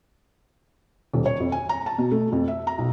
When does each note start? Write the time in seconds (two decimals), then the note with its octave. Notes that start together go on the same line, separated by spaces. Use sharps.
1.14 D#1
1.26 C#5
1.40 F2
1.52 G#5
1.69 A#5
1.86 A5
1.98 B2
2.11 A3
2.32 F2
2.48 E5
2.67 A#5
2.78 B1